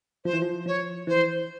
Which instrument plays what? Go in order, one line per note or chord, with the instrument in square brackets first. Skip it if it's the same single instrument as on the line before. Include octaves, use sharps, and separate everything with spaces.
[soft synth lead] F3 [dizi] C5
[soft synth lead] E3
F3
[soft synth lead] F3 [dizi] C#5
[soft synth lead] E3 [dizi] C5